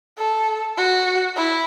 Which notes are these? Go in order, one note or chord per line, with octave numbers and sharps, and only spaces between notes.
A4
F#4
E4